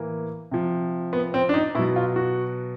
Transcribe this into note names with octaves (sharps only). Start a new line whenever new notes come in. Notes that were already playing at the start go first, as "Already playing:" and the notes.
Already playing: A2 E3 A#3
C3 F3
B3
C4
D4
D#4
B2 F#3 E4
F4
F#4